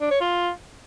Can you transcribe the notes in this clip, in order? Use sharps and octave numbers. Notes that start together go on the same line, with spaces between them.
D4
C#5
F4